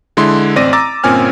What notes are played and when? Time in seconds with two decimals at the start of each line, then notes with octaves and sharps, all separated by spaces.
0.17 D3 G#3 E4 C6
0.56 A1 C4 D5 D6 A#6 D#7
0.73 A#5 D6 E6 A6
1.04 G1 A#2 C4 C#4 G#5 F6